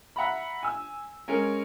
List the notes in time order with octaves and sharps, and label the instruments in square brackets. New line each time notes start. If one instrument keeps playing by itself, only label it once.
[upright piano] E5 F#5 A#5 B5
G#5 E6
G#3 C#4 A#4